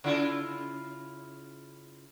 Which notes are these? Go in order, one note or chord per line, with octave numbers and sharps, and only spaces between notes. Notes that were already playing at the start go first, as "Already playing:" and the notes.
C#3 E4 F4